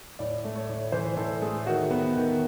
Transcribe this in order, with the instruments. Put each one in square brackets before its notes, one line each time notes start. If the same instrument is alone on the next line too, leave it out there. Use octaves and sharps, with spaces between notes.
[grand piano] A2 D5
A3
C#5
A2
E3 C5
A2 A4
A3 G#4
D#3 F#4
B3
D#3